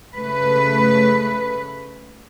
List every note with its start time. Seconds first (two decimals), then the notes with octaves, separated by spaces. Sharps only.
0.16 C#3 A3 B4